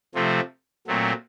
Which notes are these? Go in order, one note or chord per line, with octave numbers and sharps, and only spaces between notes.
C3 F3 A3 C4
A#2 F#3 A3 C4